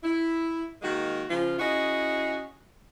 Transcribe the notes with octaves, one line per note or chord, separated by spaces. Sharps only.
E4
D#3 G#3 A#3 F#4
C#3 F3 F4
C#4 E4 F#4 G#4 D#5